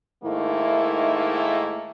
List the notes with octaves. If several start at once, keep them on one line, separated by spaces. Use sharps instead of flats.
G#2 D#3 A3 A#3 E4